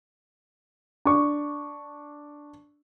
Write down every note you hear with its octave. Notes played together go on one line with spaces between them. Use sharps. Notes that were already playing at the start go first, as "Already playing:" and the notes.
D4 C#6